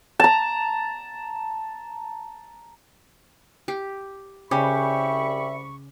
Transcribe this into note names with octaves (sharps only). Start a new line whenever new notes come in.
A5 A#5
G4
C2 C#3 G4 E5 B5 C#6